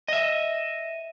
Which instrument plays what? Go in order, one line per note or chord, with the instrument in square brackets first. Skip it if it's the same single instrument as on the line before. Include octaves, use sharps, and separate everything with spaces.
[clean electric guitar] D#5 E5